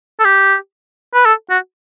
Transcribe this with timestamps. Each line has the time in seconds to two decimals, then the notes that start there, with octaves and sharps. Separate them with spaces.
0.19 A4
0.25 G4
1.14 B4
1.25 A4
1.50 F#4